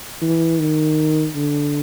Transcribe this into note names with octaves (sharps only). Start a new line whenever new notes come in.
E3
D#3
D3